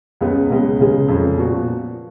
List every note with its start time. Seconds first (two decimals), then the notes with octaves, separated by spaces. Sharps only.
0.21 C#2 C#3 G#3 B3
0.50 C#2 C#3 G#3 B3
0.79 C#2 C#3 G#3
1.08 F2 C#3 G#3
1.38 A#2 F3 B3 F#4